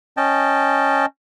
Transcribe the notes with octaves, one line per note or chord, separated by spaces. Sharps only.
C#4 D#5 G5 A5